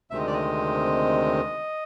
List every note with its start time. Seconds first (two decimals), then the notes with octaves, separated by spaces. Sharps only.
0.11 D2 C3 D#3 G#3 C4 E5
0.19 D#5
0.27 D5
0.33 D#5